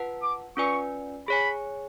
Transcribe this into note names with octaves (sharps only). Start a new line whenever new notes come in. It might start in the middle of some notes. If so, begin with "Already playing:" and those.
Already playing: F4 B4 F#5 A5
D6
C#4 F4 B4 D5 G#5 C#6
G#4 C#5 G#5 B5